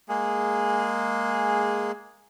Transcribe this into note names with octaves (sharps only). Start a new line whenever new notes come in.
G#3 A#3 G#4